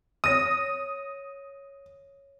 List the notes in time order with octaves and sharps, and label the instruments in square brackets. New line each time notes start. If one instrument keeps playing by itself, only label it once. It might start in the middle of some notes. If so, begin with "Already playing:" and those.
[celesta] C#5 A#6 D#7 [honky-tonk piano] D#6